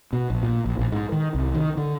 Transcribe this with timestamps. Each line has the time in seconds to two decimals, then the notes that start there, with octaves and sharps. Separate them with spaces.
0.13 B2
0.30 A#1
0.43 A#2
0.66 A#1
0.79 A#1
0.92 G#2
1.12 D#3
1.35 C2
1.54 D#3
1.77 D3